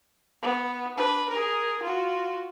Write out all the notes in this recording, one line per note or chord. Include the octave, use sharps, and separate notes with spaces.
B3
D4 B4
G#4 A#4
F4 F#4